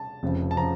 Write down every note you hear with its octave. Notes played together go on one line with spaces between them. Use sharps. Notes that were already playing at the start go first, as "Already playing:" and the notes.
Already playing: A5
F1 F2 C#3 F3
A5
C#3 F3 A#5